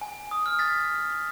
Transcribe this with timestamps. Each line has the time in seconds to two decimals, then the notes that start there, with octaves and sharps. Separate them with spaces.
0.01 G#5
0.31 D#6
0.46 F6
0.59 A6 B6